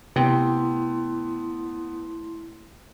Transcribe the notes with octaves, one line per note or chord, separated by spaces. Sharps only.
C3 A3 B3 E4 G5 C6